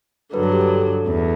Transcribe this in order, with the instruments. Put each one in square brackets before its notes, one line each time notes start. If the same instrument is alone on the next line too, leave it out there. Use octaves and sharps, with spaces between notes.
[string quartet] G2 D3 F#3 [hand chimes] B4
[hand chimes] A4
G4
A4
[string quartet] E2